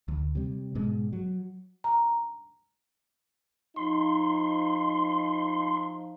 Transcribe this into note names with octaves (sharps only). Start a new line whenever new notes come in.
D2
C3 G3
G#2 B2 G#3
F#3
A#5
F3 D#4 C6